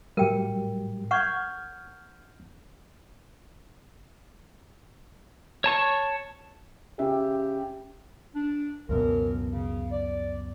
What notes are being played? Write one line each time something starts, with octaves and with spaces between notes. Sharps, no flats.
A2 F#3 G3 A#4 G5
F#5 C#6 F6 G6 G#6
C#5 A5 C#6
C#3 G4 E5
D4
C#2 F#2 B2 E3 F#3 A#4
C#3
D5